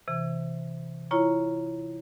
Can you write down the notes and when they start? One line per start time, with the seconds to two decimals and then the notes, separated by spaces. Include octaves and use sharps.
0.08 C3 E3
1.11 E4 F4 C#5 A#5 C#6